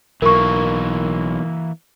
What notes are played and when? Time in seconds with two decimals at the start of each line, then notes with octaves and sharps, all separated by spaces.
0.22 B1 E3 A#3 A#4 C#6